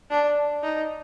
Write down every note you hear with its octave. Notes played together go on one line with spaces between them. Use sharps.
D4
D#4